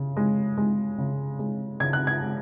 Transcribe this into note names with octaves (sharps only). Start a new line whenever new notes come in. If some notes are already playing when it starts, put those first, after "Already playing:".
Already playing: C#3
G#3
G#3
C#3
G#3
C#3 G#6
F#6
G#6
G#3